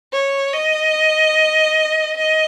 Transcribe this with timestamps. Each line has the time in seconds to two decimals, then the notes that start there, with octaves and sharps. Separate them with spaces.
0.13 C#5
0.54 D#5
2.17 D#5